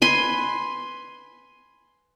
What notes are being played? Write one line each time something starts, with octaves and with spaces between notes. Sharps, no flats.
B4 G#5 C6